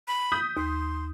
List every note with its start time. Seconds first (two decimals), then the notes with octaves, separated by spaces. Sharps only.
0.08 B5
0.32 D#6 G6 B6
0.57 D#2 C6